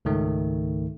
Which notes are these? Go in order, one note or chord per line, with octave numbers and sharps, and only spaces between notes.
C#2 G#2 D#3 A3